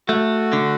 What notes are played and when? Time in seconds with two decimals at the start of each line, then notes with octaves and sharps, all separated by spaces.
0.09 A3 F#4
0.53 D3